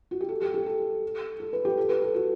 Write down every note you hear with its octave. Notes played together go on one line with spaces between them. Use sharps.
F#4
G4
A4
G4
G4
A4
A4
B4
G4
A4
B4
A4
F#4